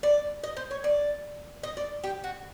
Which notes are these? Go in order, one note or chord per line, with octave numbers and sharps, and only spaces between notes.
D5
D#5
C5
C#5
D5
D#5
D5
G4
F#4